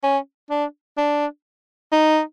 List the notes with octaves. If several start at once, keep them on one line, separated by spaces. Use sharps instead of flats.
C#4
D4
D4
D#4